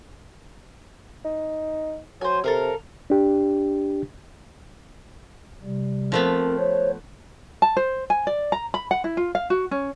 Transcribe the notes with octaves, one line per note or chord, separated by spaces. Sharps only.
D#4
F#3 C5 G#5
C3 A4 A#4 F5
D4 G4
C3 G3
F3 A3 B3 C4 A#4
C5 C#5
A5
C5
G#5
D5
A#5
B5
F#5
E4
F4
F5
F#4
C#4